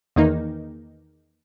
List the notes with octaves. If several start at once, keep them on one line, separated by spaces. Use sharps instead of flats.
E2 D#3 A#3 D#4